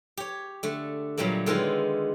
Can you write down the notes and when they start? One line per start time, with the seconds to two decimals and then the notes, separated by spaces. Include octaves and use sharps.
0.17 G4 C#5
0.63 D3 A3
1.18 A#2 F#3 G3 A3 A#3
1.46 D3 D#3 G#3 B3 E4 F4